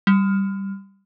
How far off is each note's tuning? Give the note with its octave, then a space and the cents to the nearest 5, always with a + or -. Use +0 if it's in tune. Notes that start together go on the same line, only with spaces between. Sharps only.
G3 -5